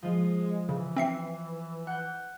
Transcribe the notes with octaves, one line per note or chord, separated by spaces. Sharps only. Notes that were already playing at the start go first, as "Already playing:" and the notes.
F3 G#3 F4
C#3 E3
C4 E5 C7
F#5 G6